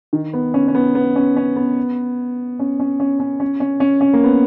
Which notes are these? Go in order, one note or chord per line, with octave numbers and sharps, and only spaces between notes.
D#3
B3
C#4
C#4
B3
B3
C#4
C#4
B3
C#4
C#4
C#4
C#4
C#4
C#4
C#4
C#4
A#3
B3